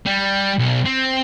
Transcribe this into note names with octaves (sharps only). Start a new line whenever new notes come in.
G3
B1
C4